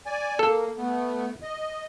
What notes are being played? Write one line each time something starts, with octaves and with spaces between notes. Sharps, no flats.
D5 G#5
A#3 A4
A3 B3
D#5